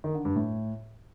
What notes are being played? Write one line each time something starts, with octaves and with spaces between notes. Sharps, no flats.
D#3
D3
G2
A2